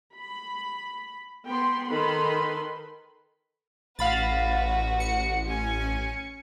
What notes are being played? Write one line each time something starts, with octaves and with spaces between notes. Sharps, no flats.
B5
B3 G5 C6
D#3 A4 B4 B5 C6
A1 F#4 B4 F5 B5 A6
C#7
C#4 G#5